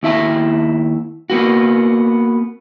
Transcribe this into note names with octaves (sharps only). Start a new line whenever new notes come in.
D#2 E4 E5 A5
A#3 B3 F#4